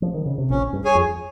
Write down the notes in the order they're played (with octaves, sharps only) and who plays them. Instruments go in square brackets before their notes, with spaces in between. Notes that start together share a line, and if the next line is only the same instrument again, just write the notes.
[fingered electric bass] F3
D#3
C#3
C3
[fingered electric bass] A#1 A#2 [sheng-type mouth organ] C#4
[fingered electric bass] G2
[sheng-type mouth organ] G#4 C#5 G#5
[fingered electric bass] F2